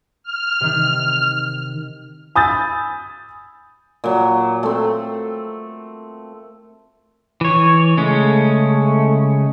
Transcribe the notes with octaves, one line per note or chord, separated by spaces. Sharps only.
F6
C3 D#3
G#5 B5 D#6 E6 G6 A6
A#2 F#3
A3 C4
E3 C#5
C#3 G#3 A3 C#4